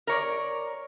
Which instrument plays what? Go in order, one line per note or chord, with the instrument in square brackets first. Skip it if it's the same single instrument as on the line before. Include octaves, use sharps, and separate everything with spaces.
[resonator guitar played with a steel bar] A#4 C#5 D5